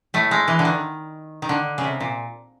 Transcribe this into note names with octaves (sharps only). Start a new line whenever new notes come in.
A2 A3
G#3
E3
D3
D#3
D#3
D3
C#3
C3
A#2